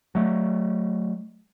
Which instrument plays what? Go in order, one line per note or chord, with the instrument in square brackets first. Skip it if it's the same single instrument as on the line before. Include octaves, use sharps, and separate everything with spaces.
[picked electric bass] F#3 A3